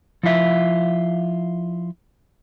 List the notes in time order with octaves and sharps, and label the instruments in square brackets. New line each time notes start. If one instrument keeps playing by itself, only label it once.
[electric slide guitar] F3 E4 F4 E5